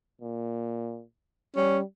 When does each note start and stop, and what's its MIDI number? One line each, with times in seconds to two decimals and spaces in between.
0.21 1.03 46
1.56 1.83 55
1.56 1.79 61